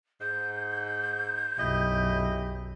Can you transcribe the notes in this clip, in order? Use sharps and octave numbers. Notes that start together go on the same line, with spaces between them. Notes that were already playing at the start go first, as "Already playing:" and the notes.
G#2 G6
B1 F#2 E4 G4 D#5